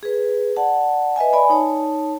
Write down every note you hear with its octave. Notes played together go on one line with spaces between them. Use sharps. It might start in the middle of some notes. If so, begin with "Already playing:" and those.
G#4 B4
D5 F#5 A5
B4 D#5 E5 G#5
D5 G#5 B5
D#4 C#5 A5